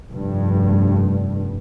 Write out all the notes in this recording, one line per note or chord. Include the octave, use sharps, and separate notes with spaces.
F1 G2